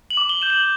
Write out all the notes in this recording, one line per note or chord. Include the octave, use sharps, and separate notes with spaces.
F#7
D6
G7
G6 E7
F#7